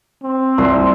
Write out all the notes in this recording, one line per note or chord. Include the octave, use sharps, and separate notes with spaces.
C4
C2 C6